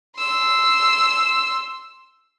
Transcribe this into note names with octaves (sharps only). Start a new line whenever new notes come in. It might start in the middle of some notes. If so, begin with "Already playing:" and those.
C6 E6